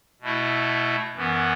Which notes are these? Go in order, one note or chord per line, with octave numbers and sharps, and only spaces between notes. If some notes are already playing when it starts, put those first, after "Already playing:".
B2 A3 E4
F#2 E3 B3